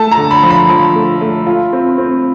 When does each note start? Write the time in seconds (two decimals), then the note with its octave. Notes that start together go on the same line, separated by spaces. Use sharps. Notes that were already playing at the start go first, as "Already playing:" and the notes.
Already playing: A3 A5
0.12 A#5
0.17 D3
0.31 B5
0.43 F3
0.50 B5
0.69 F3
0.96 A3
1.21 A3
1.47 F4
1.73 C4
1.98 C4